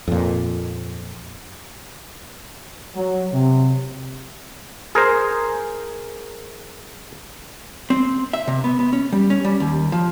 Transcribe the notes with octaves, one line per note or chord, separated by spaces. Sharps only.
F2 A#2
F#3
C3
G#4 A#4 C5
C4
E5
C3
B3
B3
C#4
G3
C#4
G3
D#2
F3